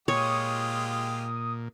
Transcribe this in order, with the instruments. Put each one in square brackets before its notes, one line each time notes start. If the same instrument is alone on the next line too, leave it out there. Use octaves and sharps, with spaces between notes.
[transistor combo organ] A#2 [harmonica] G#3 F4 G4 [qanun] C#5 [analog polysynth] D#6